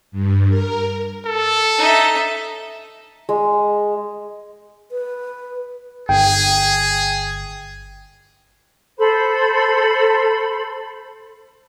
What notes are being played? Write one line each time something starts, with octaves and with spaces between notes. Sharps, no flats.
G2
A#4
A4
D#4 E5
G#3
B4
G1 G#4 G5
A4 C5 B5